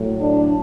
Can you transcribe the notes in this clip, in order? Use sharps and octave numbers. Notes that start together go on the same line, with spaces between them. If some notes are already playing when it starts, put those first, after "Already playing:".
Already playing: A2 F#3 A3
D4